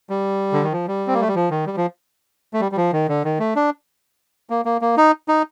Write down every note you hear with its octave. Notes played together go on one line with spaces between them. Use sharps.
G3
D3
D#3
F3
G3
C4
A#3
A3
G3
F3
D#3
G3
F3
A3
G3
G3
F3
D#3
D3
D#3
A3
D4
A#3
A#3
A#3
D#4
D#4